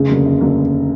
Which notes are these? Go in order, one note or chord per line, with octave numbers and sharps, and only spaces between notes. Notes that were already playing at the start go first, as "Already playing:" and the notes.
Already playing: F1 C#3
D#2 D3 F#3 A#3
F1
D3 F#3 A#3